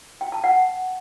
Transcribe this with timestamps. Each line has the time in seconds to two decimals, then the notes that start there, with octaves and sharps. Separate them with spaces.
0.21 G5
0.32 A5
0.44 F#5